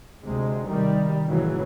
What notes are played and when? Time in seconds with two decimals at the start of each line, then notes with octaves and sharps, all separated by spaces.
0.23 D2 C3 G#3
0.65 C3 D#3 G3
1.27 F1 A2 C#3 E3 F#3